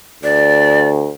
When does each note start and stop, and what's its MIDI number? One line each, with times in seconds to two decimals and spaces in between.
0.23 1.12 38
0.23 0.88 74